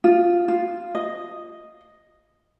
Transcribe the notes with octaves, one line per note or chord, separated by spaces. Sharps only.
F4
F4
D#5